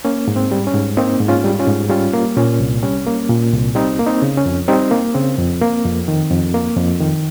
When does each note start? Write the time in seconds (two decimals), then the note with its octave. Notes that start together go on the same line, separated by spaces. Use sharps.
0.05 A#3 C#4
0.28 G#2
0.36 C4
0.51 G3
0.67 C#4
0.74 G#2
0.97 A#3 C4 D#4
1.20 G#2
1.28 C#4 F4
1.44 G3
1.59 C#4 F4
1.67 G#2
1.90 G3 C#4 F4
2.14 A#3
2.37 A#2 C#4
2.60 C2
2.83 G3 C#4
3.06 A#3
3.29 A#2
3.53 C2
3.75 G3 C4 D#4
3.99 A#3
4.07 C4 D#4
4.22 C#3
4.37 C#4
4.46 F2
4.68 G3 C4 D#4
4.91 A#3
5.14 C#3 C4
5.39 F2
5.62 A#3
5.85 F2
6.08 D#3
6.31 F2
6.54 A#3
6.77 F2
7.01 D#3